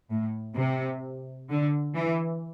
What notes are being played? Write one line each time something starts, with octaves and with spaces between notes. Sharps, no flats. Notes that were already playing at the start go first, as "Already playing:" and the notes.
A2
C3
D3
E3